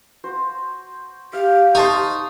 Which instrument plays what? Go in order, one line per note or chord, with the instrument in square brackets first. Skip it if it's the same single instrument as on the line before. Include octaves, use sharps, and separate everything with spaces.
[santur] F#4 C5
[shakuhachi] G4 [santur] F5
[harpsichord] D#4 [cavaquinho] C5 A5 C#6